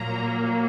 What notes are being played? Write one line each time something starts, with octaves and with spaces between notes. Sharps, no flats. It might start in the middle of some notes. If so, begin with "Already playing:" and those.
Already playing: A#2 F#3 A#3 A#5